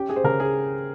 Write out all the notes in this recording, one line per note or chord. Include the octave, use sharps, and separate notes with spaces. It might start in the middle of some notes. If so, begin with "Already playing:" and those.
Already playing: C#4 G4
G#4
C5
C#3 A#4
G#4